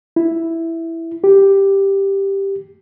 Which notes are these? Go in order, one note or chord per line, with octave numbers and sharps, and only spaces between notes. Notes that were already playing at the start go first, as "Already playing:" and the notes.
E4
G4